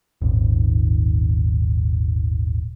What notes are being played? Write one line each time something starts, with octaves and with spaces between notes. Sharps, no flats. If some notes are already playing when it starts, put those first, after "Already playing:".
D#1 G#1